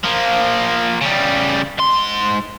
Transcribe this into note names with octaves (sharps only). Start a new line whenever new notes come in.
F3 A#3
C#3 G3
G#2 C6